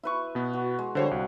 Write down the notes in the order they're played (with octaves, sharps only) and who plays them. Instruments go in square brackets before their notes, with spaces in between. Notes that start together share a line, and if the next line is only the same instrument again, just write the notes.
[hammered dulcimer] E4 B4 C#6
[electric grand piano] B2 B3
[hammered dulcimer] F#4
G#3
[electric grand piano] D3 C5 C#5 [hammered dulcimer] F3 G3 F#4
[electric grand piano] C2